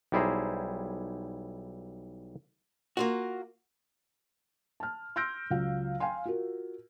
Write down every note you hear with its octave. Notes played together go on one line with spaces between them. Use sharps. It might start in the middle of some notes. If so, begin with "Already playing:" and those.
B1 G3 E4 G#4 C5 A#5
A#3 F4 F#4
A5 F6
C6 E6 F6 G6 A#6 D7
C#2 F#3 F4 F5
F5 G5 G#5 C6
F4 F#4 A#4